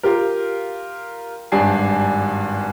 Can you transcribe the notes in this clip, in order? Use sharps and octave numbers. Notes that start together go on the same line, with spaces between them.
F4 G4 A#4
G#1 G2 D4 G4 G#5 C7